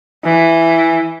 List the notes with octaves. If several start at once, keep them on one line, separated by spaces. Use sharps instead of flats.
E3